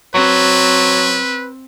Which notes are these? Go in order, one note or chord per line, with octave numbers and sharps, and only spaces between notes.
F#3 C4 B4